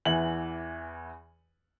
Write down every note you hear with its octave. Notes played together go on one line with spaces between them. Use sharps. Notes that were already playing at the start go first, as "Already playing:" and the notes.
E2 E3 F#7